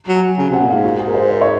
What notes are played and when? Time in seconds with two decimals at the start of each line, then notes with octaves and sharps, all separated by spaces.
0.08 F#3
0.16 G#5
0.38 C#3 G#5
0.49 C3 F#5
0.61 A#2
0.69 F5
0.72 G#2
0.84 F#4
1.00 G#4
1.07 A#4
1.14 C5
1.30 C5
1.41 C#5